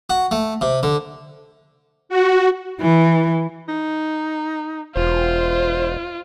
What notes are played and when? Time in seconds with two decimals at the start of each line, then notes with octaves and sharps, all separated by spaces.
0.10 F#4
0.31 A3
0.61 C3
0.83 D3
2.09 F#4
2.81 E3
3.68 D#4
4.96 E1 F4 C5